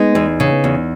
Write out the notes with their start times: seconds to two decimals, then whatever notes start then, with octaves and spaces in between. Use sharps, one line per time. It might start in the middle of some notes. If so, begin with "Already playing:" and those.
Already playing: G#3 B3 D#4
0.15 E2
0.40 C#3
0.64 E2